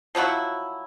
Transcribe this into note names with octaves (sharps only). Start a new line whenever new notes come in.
F3 F#3 E4 F#4